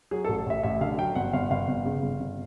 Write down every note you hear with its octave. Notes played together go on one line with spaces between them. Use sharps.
F#3 G#4
A1 A4
A1 E5
A1 E5
D3 F5
F#3 G5
G1 F#5
G1 F5
G1 F5
G1
C#3
G1
G1